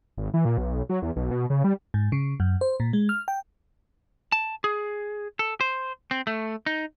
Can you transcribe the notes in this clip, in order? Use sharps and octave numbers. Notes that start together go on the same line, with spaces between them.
G#1
E3
A#2
B1
F#3
E2
B1
B2
C#3
G3
G#2
C#3
F#2
C5
A#2
G#3
F6
G5
A5
G#4
A4
C5
C4
A3
D#4